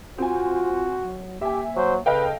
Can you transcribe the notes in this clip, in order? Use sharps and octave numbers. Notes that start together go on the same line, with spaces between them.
C4 F4 F#4 G#5
F#3
A#3 G4 E5 G#5
F#3 C5
C#3 A4 B4 D#5 F5 G5